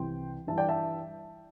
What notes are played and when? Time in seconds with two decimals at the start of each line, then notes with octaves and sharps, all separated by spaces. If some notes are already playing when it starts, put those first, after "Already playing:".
Already playing: C2 C3 E3 G5 C6
0.47 G2 E3 E5 A5
0.58 D5 G5
0.69 E5 A5